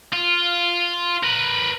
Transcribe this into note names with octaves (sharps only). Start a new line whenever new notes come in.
F4
A#4 B4